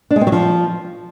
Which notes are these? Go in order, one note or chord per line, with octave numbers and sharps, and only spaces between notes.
D4
G#3
C4
F#3
F3